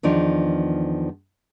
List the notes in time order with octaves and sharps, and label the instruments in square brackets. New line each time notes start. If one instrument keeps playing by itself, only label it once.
[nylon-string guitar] E2 D#3 F3 D4